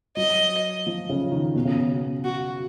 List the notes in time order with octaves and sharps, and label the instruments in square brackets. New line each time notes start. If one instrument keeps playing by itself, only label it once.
[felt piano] F#3 [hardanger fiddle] D#5
[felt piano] F3
C#3
D#3
B2
C#3
B2
[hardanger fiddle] F#4